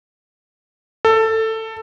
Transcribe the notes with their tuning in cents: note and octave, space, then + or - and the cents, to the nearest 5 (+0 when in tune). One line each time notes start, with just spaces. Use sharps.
A4 +15